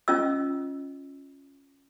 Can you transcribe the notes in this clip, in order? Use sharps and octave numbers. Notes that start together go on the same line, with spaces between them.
C#4 F4 D#5 E6